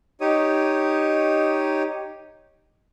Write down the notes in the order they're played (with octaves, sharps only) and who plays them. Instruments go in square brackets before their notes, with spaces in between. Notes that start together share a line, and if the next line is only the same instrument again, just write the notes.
[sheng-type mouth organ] D#4 G4 C#5 D#6